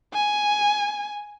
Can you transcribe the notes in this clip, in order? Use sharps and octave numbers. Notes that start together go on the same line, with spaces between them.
G#5